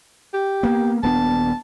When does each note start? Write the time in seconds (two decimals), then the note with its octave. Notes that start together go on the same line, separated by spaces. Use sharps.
0.34 G4
0.63 A#3 B3
1.03 D#1 B3 D4 A5